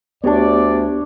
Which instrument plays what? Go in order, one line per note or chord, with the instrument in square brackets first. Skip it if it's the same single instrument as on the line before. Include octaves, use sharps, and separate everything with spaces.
[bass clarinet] D2 [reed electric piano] B3 G4 [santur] D4 C#5 [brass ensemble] D5